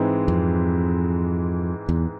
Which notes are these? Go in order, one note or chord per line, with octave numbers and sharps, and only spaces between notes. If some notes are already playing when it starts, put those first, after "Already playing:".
Already playing: G#2 E3 G#3 C4
F2
E2